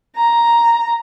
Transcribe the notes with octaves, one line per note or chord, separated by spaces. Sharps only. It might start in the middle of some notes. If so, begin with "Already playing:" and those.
A#5